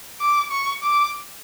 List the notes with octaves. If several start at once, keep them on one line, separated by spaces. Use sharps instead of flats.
D6
C#6
D6